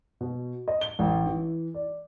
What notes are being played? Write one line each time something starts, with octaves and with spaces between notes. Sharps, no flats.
B2
D#5
G7
A1
E3
D5